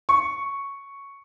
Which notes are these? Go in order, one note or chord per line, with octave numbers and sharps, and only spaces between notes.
C#6